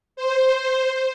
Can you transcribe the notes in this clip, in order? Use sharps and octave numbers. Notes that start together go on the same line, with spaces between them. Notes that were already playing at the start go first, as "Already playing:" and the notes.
C5